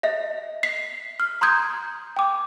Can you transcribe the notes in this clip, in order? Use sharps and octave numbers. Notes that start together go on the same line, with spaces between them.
D#5 E5
B6 C7
F6
A#5 C6 D#6 G6 G#6
G5 D6